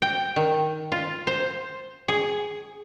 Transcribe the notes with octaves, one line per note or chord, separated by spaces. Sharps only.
G5
D#3
F4
C5
G#4